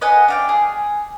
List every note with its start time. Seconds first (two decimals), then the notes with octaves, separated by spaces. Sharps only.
0.01 B4 D#5 F#5 G#5
0.28 D4 F5 G5
0.49 G#4